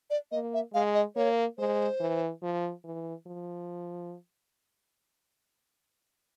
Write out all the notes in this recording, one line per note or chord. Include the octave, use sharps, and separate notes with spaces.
D5
A#3 D#5
E5
G#3 F5
D#5
A#3 C#5
G#3 C5
E3
F3
E3
F3